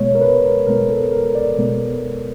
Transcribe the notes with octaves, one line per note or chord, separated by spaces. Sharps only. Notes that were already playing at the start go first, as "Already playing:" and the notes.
Already playing: B2 G#3 B3 C#5
A#4
B4
A#4
B2 G#3 B3 A#4
A4
A#4
D5
B2 G#3 B3